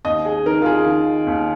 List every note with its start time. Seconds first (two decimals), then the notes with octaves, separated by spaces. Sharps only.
0.04 D#2 D#5
0.25 G#4
0.46 D#3 A#4
0.62 F4
0.66 G#4
0.86 D#3
1.27 D#2